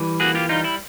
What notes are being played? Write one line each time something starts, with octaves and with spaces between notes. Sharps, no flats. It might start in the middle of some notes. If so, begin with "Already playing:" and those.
Already playing: E3 G3
A#3 F#4 G#4
F4 G4
G3 D#4 F4
E4